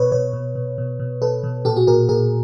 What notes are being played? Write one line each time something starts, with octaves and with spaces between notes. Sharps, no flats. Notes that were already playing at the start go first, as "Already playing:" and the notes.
Already playing: B2 B4 C#5
B2 B4 C#5
B2
B2
B2
B2
B2 A4 B4
B2
A#2 G4 A4
F#4 G#4
A#2 G#4 A#4
A#2 G#4 A#4